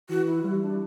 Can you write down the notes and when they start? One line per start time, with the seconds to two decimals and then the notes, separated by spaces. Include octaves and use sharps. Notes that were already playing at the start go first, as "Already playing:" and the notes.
0.09 E3 F#4
0.27 E4
0.40 F#4
0.44 G3 E4
0.62 D4